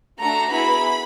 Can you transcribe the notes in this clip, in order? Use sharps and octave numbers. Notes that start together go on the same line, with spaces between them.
A3 D4 F#4 A4 A#5
B3 E4 G#4 B5